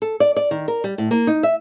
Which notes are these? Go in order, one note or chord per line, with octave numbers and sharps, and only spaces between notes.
A4
D5
D5
D#3
A#4
G3
A2
A#3
D#4
E5